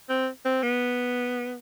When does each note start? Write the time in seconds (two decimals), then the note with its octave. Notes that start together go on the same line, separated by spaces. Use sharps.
0.09 C4
0.45 C4
0.63 B3